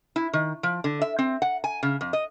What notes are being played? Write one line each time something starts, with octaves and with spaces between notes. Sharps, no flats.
E4
D#3
F3
D3
E5
C4
F#5
G#5
C#3
F2
D#5